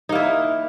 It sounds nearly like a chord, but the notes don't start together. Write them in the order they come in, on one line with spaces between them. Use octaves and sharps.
D#4 A#3 E4